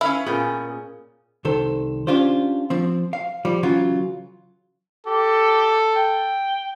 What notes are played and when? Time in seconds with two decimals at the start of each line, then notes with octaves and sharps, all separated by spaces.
0.01 C#4 E4 B4 F5
0.26 A#2 B3 C#4 G#4 A#4 G5
1.45 C2 D#3 A4 C5
2.07 C#4 D4 F4 G4 C5
2.70 F3 C4
3.13 F5
3.45 F3 G3
3.63 C#3 E3 F#3 F4
5.07 G4 A4
5.96 G5